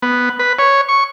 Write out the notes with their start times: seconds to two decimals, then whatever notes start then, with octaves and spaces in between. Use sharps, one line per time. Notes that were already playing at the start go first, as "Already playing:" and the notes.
0.02 B3
0.39 B4
0.59 C#5
0.89 C#6